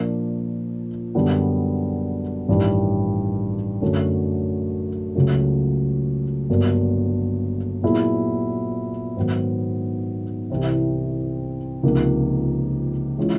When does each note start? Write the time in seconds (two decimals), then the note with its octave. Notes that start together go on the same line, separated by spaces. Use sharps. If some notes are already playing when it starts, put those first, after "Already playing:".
Already playing: A#2 F3 A#3 D4 F4
1.15 F#2 D3 G3 B3 D4
2.49 A1 G2 D#3 G3
3.82 F#2 D3 F#3 A3 C#4
5.16 C#2 C#3 F#3 A3
6.49 G1 G2 D3 F#3 A#3
7.83 A#2 F#3 B3 E4 G#4
9.17 G#2 D#3 F#3 B3
10.50 C2 C3 E3
11.83 C#2 C3 F3 A#3 D#4
13.18 E3 G#3 C#4 F4